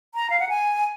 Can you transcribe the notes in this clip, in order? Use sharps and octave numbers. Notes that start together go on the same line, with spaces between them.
A#5
F5
F#5
G#5